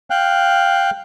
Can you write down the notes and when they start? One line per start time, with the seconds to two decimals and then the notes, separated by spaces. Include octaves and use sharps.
0.10 F5 G5 F#6